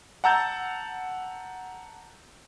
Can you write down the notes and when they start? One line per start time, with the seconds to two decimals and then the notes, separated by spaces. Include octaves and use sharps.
0.24 F#5 A5 A#5 E6 G6 A6